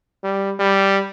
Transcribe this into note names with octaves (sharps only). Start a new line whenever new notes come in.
G3
G3